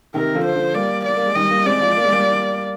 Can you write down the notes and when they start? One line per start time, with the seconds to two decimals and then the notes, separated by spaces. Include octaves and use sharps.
0.14 C3 D#3 A#4
0.35 D3 F3
0.45 C5
0.55 D3 F3
0.74 G3 A#3 D5
1.05 D5
1.16 A#3
1.26 G#3
1.35 D#3 G3 D#5
1.50 G3 A#3
1.65 G#3 C4 D5
1.80 F3 G#3
1.97 A#3
2.05 G#3
2.12 G3 A#3